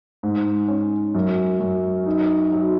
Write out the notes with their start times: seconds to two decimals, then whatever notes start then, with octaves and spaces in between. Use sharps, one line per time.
0.23 G#2
0.68 C#4
1.15 F#2
1.60 F#2
2.06 D#4
2.52 F#3